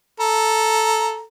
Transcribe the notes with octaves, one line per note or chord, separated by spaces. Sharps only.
A4 A#5